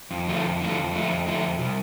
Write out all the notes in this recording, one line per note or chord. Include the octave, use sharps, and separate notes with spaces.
F2
D3 F3 A3
F2
D3 F3 A3
F2
D3 F3 A3
F2
D3 F3 A3
F2
C3 G3